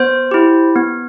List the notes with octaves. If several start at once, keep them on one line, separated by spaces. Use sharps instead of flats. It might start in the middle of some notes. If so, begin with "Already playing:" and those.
Already playing: B3 C5
E4 G4
B3